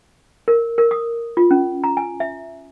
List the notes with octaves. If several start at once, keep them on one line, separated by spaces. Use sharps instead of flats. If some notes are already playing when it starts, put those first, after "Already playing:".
A#4
A#4
D#6
F4
C#4
A#5
G#5
E5